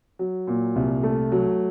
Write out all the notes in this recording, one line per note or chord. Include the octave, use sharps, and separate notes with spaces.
F#3
A#2
C2
A3
F#3